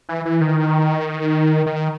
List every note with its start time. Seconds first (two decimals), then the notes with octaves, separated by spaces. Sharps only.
0.09 E3
0.25 E3
0.41 D#3
1.66 D#3